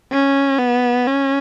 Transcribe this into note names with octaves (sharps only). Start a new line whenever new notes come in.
C#4
B3
C#4